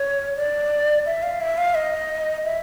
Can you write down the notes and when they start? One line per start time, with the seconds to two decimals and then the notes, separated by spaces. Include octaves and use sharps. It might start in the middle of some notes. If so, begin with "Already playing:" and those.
Already playing: C#5
0.36 D5
1.06 E5
1.23 F5
1.40 E5
1.58 F5
1.75 D#5
2.44 E5